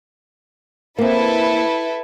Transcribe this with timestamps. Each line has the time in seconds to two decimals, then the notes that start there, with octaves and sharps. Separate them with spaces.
0.98 A#3 C4 E4 A4 B4